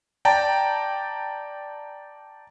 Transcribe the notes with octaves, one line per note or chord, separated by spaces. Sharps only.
D5 G5 A5 A#5